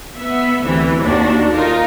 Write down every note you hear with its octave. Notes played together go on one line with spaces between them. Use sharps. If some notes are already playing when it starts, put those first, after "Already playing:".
B3 E5
D2 C3 E3
D#2 D4 F#4
D#4 F4 A#4